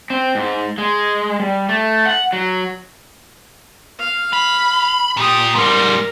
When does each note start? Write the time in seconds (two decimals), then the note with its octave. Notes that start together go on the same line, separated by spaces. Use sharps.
0.10 C4
0.35 G#2
0.78 G#3
1.40 G3
1.69 A3
2.06 F#5
2.33 F#3
3.99 F5
4.33 B5
5.17 A#2 G4 D#6
5.55 G#2 G3 A#4